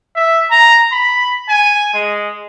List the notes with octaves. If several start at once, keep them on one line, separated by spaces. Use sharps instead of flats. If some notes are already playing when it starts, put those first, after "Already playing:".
E5
A#5
B5
G#5
G#3